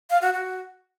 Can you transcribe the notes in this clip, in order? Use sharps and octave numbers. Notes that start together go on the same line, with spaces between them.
F5
F#4
F#4